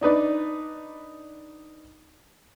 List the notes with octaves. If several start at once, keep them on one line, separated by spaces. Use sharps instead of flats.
D4 D#4 B4 D5